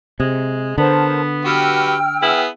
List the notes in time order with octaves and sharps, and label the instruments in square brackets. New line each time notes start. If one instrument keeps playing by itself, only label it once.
[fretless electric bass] C3 [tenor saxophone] G#3
[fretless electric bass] D3 [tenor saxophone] B3 [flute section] A#4 C5 A5
[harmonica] F#4 G4 B4 [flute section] G5 E6 F6
[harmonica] B3 G#4 [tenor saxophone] E4